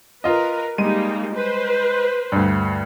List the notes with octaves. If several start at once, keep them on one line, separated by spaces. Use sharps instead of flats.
F4 A#4 B4 D#5
G3 G#3 A#3 D#4 D#7
B4 C5
D2 G2